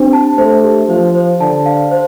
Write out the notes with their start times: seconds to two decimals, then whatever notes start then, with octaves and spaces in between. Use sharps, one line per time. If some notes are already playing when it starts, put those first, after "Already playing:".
Already playing: C4 D4 G4
0.13 A5
0.38 A3 C5
0.64 G4
0.89 F3 C5
1.15 C5
1.41 D3 A5
1.66 F5
1.91 C5